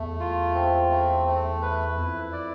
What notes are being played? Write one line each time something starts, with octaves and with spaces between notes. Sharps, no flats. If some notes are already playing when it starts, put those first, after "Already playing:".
Already playing: E2 A3
F4
C4
A3
A3
B4
F2 E4
D5